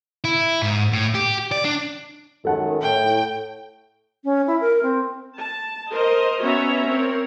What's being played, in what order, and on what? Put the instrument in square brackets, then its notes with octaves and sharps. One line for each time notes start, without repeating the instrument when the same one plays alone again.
[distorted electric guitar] E4
G#2
A2
G4
D5
D4
[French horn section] F#2 D#3 G#3 [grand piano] A4 F#5 A5
[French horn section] A2 [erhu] G5
[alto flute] C#4
E4
A#4
C4
[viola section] A5
A#4 C5 D#5
B3 C#4 F#4 C#5 E5 A#5
C4 A#4 C#5